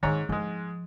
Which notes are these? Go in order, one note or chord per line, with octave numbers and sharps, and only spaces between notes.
G#2 D#3 D#4 C#5 A#5
G#2 F3 G#3